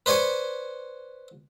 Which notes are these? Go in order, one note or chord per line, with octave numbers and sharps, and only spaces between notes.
B4 C5 D5 G#5 C#6